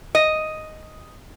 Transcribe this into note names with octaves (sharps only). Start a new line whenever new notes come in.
D#5